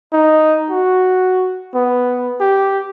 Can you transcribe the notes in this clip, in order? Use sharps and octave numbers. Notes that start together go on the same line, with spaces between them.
D#4
F#4
B3
G4